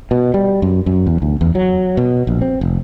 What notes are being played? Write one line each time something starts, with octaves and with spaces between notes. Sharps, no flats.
B2
G3
F#2
F#2
E2
D2
E2
F#3
B2
A#1
C4
F1